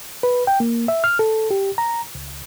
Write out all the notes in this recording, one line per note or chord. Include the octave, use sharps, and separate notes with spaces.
B4
G5
A#3
E5
F6
A4
G4
A#5
C#2